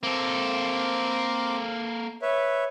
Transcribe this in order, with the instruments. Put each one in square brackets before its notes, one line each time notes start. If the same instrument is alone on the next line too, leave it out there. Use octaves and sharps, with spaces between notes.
[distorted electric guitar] A#3 A4 [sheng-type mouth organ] C4 D6
[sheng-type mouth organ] B4 C#5 E5